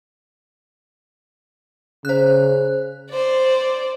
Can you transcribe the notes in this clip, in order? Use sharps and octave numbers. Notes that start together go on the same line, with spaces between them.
C#3 C5 F#6
C5 D5